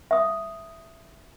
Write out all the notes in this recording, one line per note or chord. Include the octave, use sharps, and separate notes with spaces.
E5 D#6